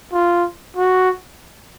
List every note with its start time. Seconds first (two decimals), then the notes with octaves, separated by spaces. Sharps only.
0.13 F4
0.76 F#4